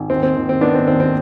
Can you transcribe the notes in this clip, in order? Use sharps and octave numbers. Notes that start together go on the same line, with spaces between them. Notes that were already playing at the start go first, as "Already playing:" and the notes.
Already playing: G#1
D#2 C4
C4
D#2
C4
D#2 B3 D4
C4
D#2 C4
C4